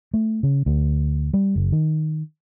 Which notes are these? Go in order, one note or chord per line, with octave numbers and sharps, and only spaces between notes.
A3
C#3
D2
G3
F#1
D#3